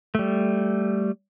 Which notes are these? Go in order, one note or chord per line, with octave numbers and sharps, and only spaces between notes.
G3 A3